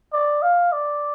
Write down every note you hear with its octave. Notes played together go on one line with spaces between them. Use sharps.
D5
F5
D5